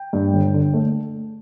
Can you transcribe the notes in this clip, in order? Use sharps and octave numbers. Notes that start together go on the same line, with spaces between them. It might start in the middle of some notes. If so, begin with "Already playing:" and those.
Already playing: G5
G2
G1
D3
A3